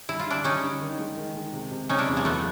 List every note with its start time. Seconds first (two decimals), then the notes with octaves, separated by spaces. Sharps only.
0.09 G3 E4
0.19 F4
0.27 D3 D4 E4
0.44 G3 C#4 D#4
0.64 D3
0.81 D#3
0.99 G#3
1.17 D#3
1.35 G#3
1.53 C3
1.72 C3
1.89 C3 C#4 D#4
1.98 D4 E4
2.08 E2
2.17 G#3 A#3
2.25 F#3 A3 B3